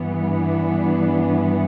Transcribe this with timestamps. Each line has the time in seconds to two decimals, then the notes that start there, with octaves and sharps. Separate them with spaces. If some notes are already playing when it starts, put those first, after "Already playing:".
Already playing: G2 E3 B3
0.26 D4